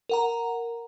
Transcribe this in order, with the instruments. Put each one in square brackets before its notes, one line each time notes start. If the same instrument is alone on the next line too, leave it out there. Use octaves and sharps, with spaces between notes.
[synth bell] A#4 F#5 A#5